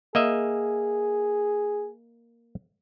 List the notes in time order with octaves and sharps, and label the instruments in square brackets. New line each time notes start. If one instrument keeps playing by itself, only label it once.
[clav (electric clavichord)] A#3 D#5 E5 [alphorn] G#4